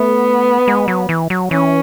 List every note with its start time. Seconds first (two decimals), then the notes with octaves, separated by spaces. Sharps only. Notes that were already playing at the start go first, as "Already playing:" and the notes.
Already playing: A3 B3
0.68 G#3
0.88 F#3
1.09 E3
1.30 F#3
1.51 E3 C#4